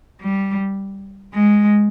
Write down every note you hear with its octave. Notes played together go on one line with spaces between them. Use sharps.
G3
G#3